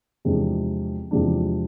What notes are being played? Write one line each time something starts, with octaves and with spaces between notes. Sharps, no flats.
E2 C3 F3 G#3 D4
E2 C3 F3 G#3 D4